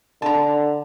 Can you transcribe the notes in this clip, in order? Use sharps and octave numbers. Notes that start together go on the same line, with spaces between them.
D3 A5 A#5